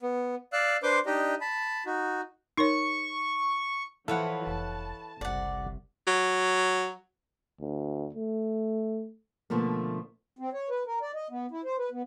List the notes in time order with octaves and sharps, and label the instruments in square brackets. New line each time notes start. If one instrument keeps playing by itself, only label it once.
[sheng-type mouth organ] B3
D5 F5 E6 F#6
D4 B4 C5 C6 D6
D4 D#4 G4 D#5
A5 B5
D#4 F#4
[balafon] D#4 A#4 C#5 [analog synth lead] C#6
[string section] E3 F3 [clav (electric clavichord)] E4 A4 F5 [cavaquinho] B4 C#5 F#5
[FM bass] F1 [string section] A5
[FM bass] F#1 [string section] C2 [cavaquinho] D5 F#5
[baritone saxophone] F#3
[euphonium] D2
A3
[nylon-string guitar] B2 D3 F3 A3 A#3
[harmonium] C4
C#5
B4
A#4
D5
D#5
B3
E4
C5
B4
B3